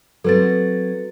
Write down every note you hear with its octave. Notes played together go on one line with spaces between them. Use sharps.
F#3 C4 A4 B4 A6